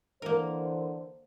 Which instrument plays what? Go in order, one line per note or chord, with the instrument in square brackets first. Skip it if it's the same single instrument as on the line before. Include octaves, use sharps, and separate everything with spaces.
[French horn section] D3 E3 C5 [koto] A#3 A#4